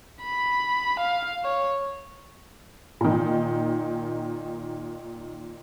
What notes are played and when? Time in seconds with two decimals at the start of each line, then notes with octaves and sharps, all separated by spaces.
0.23 B5
0.99 F5
1.44 C#5
3.01 A#2 D#3